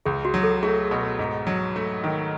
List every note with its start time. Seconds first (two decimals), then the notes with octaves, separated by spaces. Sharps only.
0.06 C#2 G#4
0.25 F#4
0.34 F#3
0.43 A4
0.63 A3 G#4
0.91 B2
1.19 G#2
1.47 F#3
1.76 A3
2.04 D#3